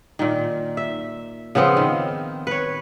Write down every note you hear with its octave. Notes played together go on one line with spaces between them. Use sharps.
A#2 D#3
E5
C#3 F3 B3 C4
D#3
B4 C#5